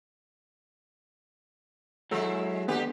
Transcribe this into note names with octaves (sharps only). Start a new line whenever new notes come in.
F#3 G#3 E4 A4 A#5
D3 B3 G4 B4